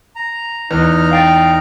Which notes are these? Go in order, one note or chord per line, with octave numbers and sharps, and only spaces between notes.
A#5
E2 D#4 B4 A#5 F6
F5 G5 A6